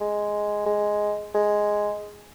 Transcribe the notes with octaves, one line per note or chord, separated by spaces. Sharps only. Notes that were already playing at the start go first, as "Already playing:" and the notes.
G#3
G#3
G#3